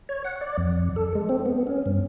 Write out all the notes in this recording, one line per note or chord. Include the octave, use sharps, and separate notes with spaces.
C#5
F#5
D5
F2
A4
G#3
C4
B3
C#4
G2